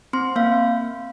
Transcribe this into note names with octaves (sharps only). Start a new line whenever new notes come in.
C4 C6
A#3 F5